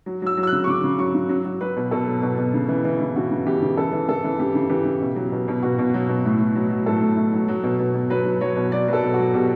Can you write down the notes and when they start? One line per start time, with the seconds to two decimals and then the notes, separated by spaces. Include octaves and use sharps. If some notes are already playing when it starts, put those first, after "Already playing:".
0.06 F#3
0.22 F#3 E6
0.37 F#3
0.43 E6
0.47 F#6
0.52 C#3
0.64 C#6
0.67 C#3 D6
0.84 C#3
0.99 F#3 C#6
1.14 C#3
1.29 F#3
1.45 F#3
1.61 F#3 B4
1.77 B2
1.91 B2 A4
2.07 F#3
2.23 B2
2.38 B2
2.54 C#3
2.69 E3
2.85 E3
3.00 C#3
3.16 C#3 F#4
3.31 C#3
3.46 E3 G4
3.62 C#3
3.77 E3 A4
3.93 E3
4.09 C#3 A4
4.24 E3
4.39 C#3 G4
4.55 C#3
4.70 E3 G4
4.85 C#3
5.01 B2
5.16 F#3
5.32 B2
5.48 B2
5.62 B2 F#4
5.79 B2
5.94 F#3
6.09 B2
6.25 A2
6.40 A2
6.55 F#3
6.71 F#3
6.86 A2 A4
7.02 A2
7.17 A2
7.33 F#3
7.48 F#3
7.63 B2
7.80 B2
7.94 B2
8.10 F#3 B4
8.25 F#3
8.41 F#3 C#5
8.56 B2
8.72 F#3 D5
8.88 F#3 B4
8.93 A4
9.03 B2
9.14 F#4
9.19 F#3
9.34 B2 G4